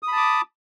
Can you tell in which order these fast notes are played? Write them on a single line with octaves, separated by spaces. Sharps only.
D#6 B5 A5 D6